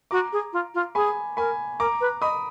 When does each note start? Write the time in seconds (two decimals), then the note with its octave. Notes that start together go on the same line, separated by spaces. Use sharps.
0.11 F#4 A#5 D6
0.32 G#4
0.53 F4
0.74 F4
0.95 G#4 G#5 B5
1.37 A#4 G#5 B5
1.79 A#4 A#5 D6
2.01 B4
2.22 D#5 B5 D#6